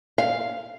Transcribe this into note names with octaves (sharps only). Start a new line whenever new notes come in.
F5